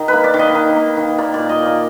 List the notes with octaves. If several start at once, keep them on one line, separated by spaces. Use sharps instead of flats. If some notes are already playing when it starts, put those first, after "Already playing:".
Already playing: D#3
A#3 B4
D5
D#3
D#5
D#3
A#3
D#3
A#3 D5
A#2 D5
D#5
A#2
D5